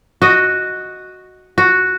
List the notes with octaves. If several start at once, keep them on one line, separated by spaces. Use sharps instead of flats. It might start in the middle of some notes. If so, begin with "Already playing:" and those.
F#4 D#5
F#4